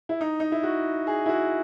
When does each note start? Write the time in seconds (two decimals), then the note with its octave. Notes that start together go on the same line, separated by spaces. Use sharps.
0.09 E4
0.21 D#4
0.40 D#4
0.52 E4
0.63 F#4
1.07 G#4
1.26 E4
1.29 F#4